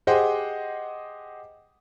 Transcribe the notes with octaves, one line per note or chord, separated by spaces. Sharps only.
G4 G#4 C5 D#5 F#5 G5